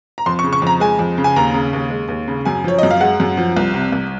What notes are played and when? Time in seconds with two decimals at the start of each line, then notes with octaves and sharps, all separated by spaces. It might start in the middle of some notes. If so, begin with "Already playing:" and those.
0.18 A#5
0.26 F2 C6
0.39 C#6
0.44 C#3
0.53 C#6
0.62 F2 A#5
0.80 G#3 G#5
0.99 F2
1.18 C#3
1.24 G#5
1.36 D#2 A#5
1.54 C#3
1.73 D#2
1.90 G#3
2.09 D#2
2.28 C#3
2.45 F#2 G#5
2.64 F3 C#5
2.78 F#2 D#5
2.91 F5
3.00 G#3 F#5
3.20 F#2
3.37 F3
3.57 C2
3.74 C3
3.92 C2